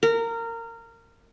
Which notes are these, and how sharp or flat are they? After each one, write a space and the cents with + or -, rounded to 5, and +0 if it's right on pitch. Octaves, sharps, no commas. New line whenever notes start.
A#4 -20